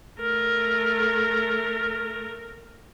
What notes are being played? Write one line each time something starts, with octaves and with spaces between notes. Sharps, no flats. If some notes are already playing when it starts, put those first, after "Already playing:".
A3 A#4